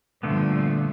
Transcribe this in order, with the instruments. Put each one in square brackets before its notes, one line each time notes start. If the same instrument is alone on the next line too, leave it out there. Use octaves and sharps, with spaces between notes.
[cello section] G2 A#2 F3 [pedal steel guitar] D3 A3 B3